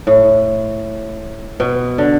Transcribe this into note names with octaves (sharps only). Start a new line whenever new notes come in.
A2
B2
D3